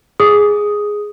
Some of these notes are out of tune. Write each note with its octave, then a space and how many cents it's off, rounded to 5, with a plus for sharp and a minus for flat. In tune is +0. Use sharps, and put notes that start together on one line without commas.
G#4 +0 D#6 +0